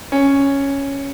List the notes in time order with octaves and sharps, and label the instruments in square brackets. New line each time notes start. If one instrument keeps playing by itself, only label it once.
[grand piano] C#4